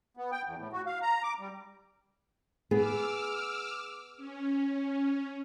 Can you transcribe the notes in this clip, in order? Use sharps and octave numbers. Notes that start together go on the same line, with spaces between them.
B3
G5
E2
A2
F#4
F5
A#5
D6
G3
B3 G#4 D6 E6 F6
C#4